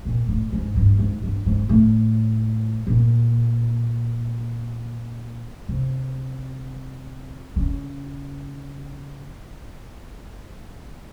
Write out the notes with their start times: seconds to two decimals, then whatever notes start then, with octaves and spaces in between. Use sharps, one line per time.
0.05 A#2
0.28 A2
0.52 G#2
0.76 G2
0.99 G#2
1.23 G2
1.46 G#2
1.69 A2
2.87 A#2
5.68 C3
7.56 C#3